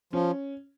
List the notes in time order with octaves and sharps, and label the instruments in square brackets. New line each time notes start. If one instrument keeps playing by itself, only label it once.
[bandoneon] F3 [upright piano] C#4